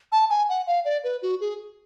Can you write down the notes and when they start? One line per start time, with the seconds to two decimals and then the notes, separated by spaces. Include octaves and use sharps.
0.12 A5
0.30 G#5
0.49 F#5
0.67 F5
0.85 D5
1.04 B4
1.22 F#4
1.41 G#4